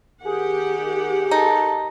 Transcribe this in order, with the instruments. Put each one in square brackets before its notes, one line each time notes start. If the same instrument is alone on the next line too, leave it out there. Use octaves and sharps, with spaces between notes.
[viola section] D#3 G4 F#5 [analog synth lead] G#4
[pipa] D#4 [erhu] A4